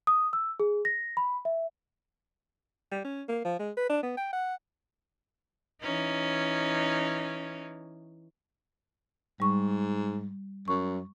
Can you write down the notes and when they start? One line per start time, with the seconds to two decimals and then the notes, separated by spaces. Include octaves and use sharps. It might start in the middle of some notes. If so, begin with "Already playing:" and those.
0.07 D#6
0.33 E6
0.60 G#4
0.85 A#6
1.17 B5
1.45 E5
2.91 G3
3.05 C#4
3.29 A#3
3.45 F3
3.59 G#3
3.77 B4
3.90 D4
4.03 B3
4.17 G5
4.33 F#5
5.82 E3 C#4 D#4
9.40 G#2 G3 C#6
10.68 F#2 C#6